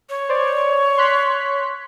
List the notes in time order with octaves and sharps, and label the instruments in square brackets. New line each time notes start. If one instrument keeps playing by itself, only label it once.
[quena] C#5
[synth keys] C5 D5
C6 F#6 B6